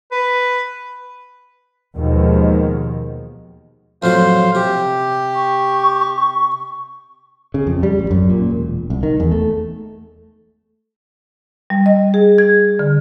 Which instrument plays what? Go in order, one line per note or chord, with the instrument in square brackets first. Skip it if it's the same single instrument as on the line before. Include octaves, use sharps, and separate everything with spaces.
[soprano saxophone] B4
[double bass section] D#2 B2 D#3 F3 G#3
[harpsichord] F2 A2 F#3 [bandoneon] C5 F5
[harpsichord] C3 [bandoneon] G4
[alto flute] C#6
[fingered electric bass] C#3
F2
G3
A1
F#2
A#2
E1
C2
D#3
E2
A3
[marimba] G3
D#5
G#4
G#6
D3